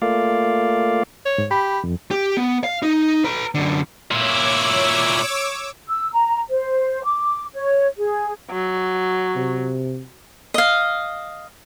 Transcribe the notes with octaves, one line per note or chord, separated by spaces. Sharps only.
A3 A#3 F4 D5 F5
C#5
G#2
G4 B5
F2
G4
B3
F5
D#4
B4 A#5
F#2 D3
A#2 E4 C#5 D6 E6
E6
A#5
C5
D6
C#5
G#4
F#3
C3
D#5 F5